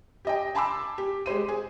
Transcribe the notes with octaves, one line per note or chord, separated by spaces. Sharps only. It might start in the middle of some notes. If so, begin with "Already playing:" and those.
G4 D#5 G5
G#5 A5 B5 C6 D6 E6
G4
G#3 G4 C5 D#7
G#4